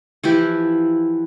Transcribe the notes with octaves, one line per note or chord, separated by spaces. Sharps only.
E3 F3 E4 G4